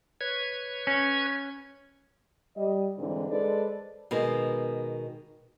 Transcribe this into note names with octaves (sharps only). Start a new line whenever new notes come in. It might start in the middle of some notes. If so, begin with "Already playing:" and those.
B4 C#5 G#6
C#4
G3 D#5
G#2 D3 E3 C4 D4
G#3 A4 B4 C5 D5
B2 D#3 G#3